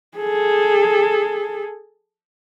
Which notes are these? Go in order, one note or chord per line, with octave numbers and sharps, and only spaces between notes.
G#4 A4